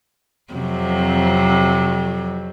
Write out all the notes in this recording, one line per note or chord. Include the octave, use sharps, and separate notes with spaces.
F2 C3 F#3